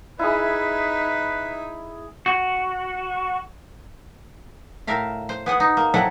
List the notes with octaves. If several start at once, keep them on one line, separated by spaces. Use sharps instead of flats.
D#4 E4 G#4 B4 E5
F#4
A2 A#4 E5 F5
C5
B3 G#4 F#5
D#4
A#3
C3 F#3 E4 A4 F#5